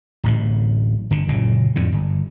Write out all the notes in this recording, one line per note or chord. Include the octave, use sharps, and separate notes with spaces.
D1 A1 A2
G1 D3
F#1 A#2 C#3
F2 A2 D3
G1